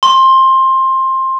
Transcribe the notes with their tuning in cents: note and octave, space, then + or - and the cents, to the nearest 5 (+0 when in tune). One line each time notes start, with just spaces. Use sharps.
C6 +15